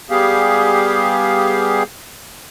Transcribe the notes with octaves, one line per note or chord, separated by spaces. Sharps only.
G3 B3 G4 G#4 F5